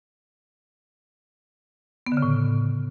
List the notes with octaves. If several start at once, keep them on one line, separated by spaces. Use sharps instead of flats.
B3
D3
C#3
A2